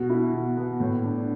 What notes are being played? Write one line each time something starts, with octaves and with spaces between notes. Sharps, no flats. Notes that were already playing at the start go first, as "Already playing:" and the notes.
Already playing: B2 F#4
E4
B2
B3
A2
D4